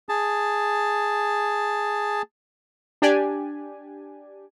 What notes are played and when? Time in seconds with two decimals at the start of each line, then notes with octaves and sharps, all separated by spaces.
0.09 G#4 A5
3.02 D4 G4 D5 G#5